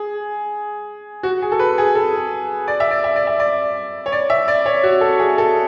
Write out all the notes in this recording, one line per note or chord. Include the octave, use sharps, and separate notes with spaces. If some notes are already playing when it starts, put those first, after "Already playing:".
Already playing: G#4
F#4
G#4
A4
B4
G#4
A4
D5
E5
D5
E5
D5
E5
D5
C#5
D5
E5
D5
C#5
F#4
A4
G#4
A4